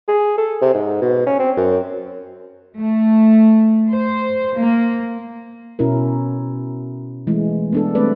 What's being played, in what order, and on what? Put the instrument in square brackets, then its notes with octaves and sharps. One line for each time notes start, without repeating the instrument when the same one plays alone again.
[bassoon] G#4
A4
C3
G#2
B2
C#4
C4
F#2
[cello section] A3
C5
A#3
[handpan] B2 C#4 E4 A#4
E3 G#3 A3
B3 D4 A4
G3 A3 C4 B4 D5